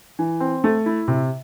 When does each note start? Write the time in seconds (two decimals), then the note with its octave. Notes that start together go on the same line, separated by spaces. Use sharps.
0.19 E3
0.40 C4
0.64 A3
0.86 E4
1.08 C3